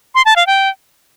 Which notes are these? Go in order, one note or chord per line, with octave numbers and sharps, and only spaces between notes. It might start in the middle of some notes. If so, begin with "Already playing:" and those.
C6
A5
F5
G5